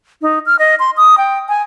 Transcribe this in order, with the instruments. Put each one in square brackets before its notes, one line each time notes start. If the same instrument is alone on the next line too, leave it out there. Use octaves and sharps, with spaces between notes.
[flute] D#4
F6
D#5
C6
D#6
G5
G#5